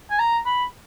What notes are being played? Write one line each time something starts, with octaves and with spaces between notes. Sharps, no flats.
G#5
A#5
B5